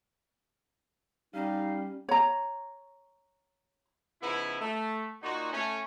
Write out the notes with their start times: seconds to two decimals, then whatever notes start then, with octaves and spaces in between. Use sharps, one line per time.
1.34 G3 C#4 D#4 F5
2.09 C#5 A#5
4.22 C#3 F3 B3 D#4 E4
4.60 A3
5.23 A#2 D#4 F#4
5.52 A3 C#4